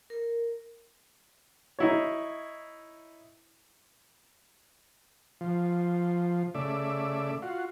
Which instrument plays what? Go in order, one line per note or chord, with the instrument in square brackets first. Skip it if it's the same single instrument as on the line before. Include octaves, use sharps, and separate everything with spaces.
[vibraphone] A#4
[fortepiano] D#4 E4 C#5
[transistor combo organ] F3
C#3 A3 D5 E5
F4 F#4